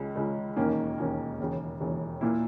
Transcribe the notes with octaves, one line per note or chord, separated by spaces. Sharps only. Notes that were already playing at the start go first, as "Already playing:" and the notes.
Already playing: C#2 C#3 G#3
C#2 C#3 G#3
E1 D#2 D#3 A#3 C#4
E1 D#2 D#3 A#3 C#4
E1 D#2 C#3
E1 D#2 C#3
A#2 A#3 E4